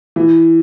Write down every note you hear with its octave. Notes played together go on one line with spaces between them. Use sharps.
E3